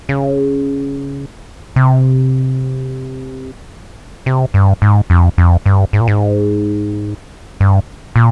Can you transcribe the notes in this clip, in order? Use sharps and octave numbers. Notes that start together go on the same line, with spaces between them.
C#3
C3
C3
G2
G#2
F2
F2
G2
G#2
A#2
G#2
G2
A#2